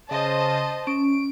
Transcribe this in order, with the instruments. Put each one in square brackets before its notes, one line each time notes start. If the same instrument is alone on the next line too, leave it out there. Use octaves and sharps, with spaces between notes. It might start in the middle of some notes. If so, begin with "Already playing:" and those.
[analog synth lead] C#3 [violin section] C5 D#5 A5
[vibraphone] C#4 [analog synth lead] D7